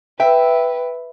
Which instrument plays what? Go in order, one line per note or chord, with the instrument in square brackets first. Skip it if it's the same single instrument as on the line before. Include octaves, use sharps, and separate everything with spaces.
[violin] B4 [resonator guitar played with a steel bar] E5 [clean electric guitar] G5